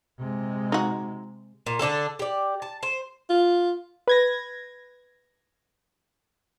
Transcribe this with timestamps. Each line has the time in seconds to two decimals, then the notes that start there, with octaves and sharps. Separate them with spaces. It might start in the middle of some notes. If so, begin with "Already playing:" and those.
0.19 C3 G#3
0.72 D#4 F#4
1.66 A#2
1.79 D3 D4 E4 A4
2.19 G4 D5
2.62 A5
2.83 C5
3.30 F4
4.08 B4 G#6 A#6